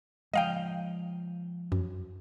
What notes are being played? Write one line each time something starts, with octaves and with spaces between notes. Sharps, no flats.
F3 G#3 D#5 F5 G5
F#2